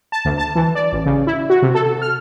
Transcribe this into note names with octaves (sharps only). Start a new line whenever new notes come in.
A5
D2
A5
E3
D5
A1
C#3
E4
F#4
C3
A4
F6